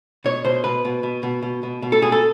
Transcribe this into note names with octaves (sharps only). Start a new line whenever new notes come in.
B2 C#5
B2 C5
B2 B4
B2
B2
B2
B2
B2
B2
A4
B2 G#4
A4